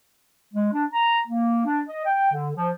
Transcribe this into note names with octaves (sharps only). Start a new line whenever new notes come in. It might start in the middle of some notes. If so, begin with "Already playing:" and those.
G#3
D4
A#5
A#3
D4
D#5
G5
D3
F3